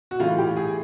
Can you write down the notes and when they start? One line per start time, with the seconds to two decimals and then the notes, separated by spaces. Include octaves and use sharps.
0.11 F#4
0.19 A2 E3 G3 F4
0.39 G4
0.56 G#4